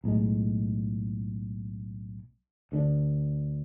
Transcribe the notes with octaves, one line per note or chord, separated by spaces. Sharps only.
B1 A2 G#3
D2 D3 G#3 D4